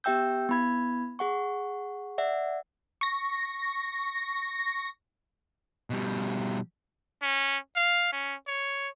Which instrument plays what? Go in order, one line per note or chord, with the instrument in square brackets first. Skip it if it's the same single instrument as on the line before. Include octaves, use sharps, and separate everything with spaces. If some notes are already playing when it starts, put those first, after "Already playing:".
[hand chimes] B3 G4 E5 G5 E6 G6
B3 E4 B5 G#6
G#4 F#5 C#6
D5 E5 F#5
[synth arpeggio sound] C#6 A#6
[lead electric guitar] B2 G3
[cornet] C#4
F5
C#4
C#5